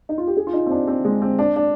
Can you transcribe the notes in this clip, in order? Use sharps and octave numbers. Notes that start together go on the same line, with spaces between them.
D#4
F4
G4
G#4
F4
D#4
C4
D4
C4
G#3
C4
D4
D4